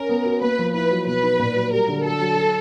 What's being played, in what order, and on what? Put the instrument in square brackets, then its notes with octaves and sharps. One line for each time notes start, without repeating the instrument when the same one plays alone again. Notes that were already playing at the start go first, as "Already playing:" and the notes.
Already playing: [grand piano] C#4 [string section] A#4
[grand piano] B3
F#4
[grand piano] A#3 [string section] B4
[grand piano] F3
[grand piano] E4 [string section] B4
[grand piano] F#3
[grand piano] B2 [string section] B4
[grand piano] D#4
A#2
F#3
[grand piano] G3 [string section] A#4
[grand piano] D3
[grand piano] F#3 [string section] A4
[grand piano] F#3
F#4